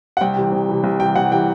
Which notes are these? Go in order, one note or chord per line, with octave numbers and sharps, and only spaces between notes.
F#5
C2 G5
C3 E3
C2
C3 E3
C2
C3 E3 G5
C2 F#5
C3 E3 G5